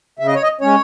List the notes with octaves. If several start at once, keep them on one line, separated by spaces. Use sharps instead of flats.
C#3 E5
D#5
C#5
D#5
G#3 C#4 C#5